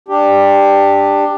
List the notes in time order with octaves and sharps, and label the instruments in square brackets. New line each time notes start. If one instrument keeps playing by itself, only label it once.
[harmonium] D4 G4